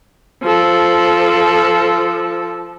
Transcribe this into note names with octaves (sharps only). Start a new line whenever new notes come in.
F3 A4